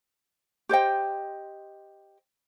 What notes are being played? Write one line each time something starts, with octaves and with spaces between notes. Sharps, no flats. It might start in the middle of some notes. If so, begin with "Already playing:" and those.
G4 C5 D#5 G5